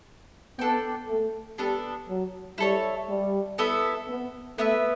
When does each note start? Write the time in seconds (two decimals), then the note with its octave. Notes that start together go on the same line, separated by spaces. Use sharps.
0.59 B3 D4 A4 D5 G5
1.08 A3
1.58 G3 B3 D4 A4
2.08 F#3
2.58 G3 E4 A4 C#5
3.08 G3
3.58 B3 E4 A4 E5
4.08 B3
4.58 A3 B3 E4 B4 E5